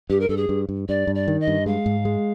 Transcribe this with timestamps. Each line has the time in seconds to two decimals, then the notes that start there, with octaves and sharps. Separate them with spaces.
0.10 G2 G4
0.20 A#4
0.28 G2 A4
0.36 G#4
0.49 G2
0.69 G2
0.88 G2 D5
1.07 G2
1.15 D5
1.28 D#3
1.40 D#5
1.47 G2
1.66 G#3 F5
1.86 G#2
2.05 G#3